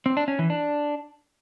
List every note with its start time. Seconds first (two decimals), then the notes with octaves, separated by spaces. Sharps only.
0.06 C4
0.17 D4
0.28 C#4
0.39 E3
0.50 D4